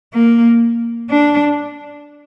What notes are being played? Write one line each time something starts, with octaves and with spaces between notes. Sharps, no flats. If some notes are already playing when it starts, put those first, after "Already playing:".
A#3
D4